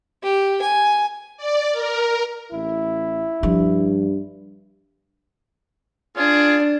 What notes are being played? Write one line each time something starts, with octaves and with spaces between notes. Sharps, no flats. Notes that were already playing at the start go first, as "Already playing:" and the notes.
G4
G#5
D5
A#4
A1 E4
G2 F3
D4 F4 G#4